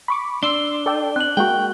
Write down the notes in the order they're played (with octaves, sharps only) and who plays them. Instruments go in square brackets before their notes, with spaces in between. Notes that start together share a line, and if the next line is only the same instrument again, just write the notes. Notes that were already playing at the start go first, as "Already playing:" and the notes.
[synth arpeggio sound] B5 C#6 D6
[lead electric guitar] D4 [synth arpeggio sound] C6 E6 C7 [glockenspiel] G7
[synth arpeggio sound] A4 D5 G5
[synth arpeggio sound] C4 [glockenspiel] F#6 F#7
[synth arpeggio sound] G#3 A#3 F#4 [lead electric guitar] G5